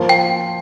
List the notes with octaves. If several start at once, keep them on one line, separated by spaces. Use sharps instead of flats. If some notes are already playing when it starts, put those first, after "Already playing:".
Already playing: F3 A#3 F4 C5
G5